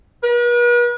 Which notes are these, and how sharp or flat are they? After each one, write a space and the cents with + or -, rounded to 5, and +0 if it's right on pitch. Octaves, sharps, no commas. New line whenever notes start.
B4 -45